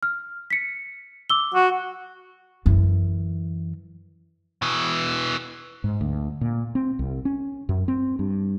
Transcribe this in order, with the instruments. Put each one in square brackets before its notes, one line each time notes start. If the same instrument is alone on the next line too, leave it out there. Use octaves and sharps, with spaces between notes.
[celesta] F6
B6 C#7
D6 E6 G7
[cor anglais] F#4
[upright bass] F#2 E3
[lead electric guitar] B2 E3
[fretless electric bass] G#2
D2
A#2
C4
C2
C#4
F#2
C4
G2